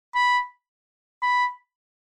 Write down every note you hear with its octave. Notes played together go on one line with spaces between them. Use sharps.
B5
B5